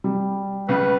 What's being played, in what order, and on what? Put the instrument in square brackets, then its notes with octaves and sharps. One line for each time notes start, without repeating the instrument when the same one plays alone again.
[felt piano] G3
[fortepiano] C#2 C#3 [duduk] B4